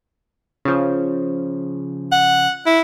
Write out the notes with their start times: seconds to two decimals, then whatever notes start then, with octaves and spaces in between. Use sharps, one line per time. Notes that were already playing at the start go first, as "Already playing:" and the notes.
0.65 C#3 F3
2.12 F#5
2.66 E4